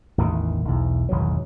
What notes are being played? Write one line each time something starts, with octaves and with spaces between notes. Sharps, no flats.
A1 E2 D#3
B1 E2
G#1 E2 B2 F#3